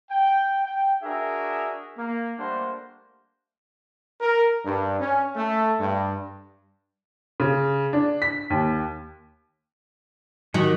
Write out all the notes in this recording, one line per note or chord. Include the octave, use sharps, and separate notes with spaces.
G5
G5
D4 F#4 G#4 A#4 E5
A#3
G3 A3 A#3 D4 C5 F#5
A#4
G2
C#4
A3
G2
C#3
D4
B6
D#2
D#3 F#3 F#4 G4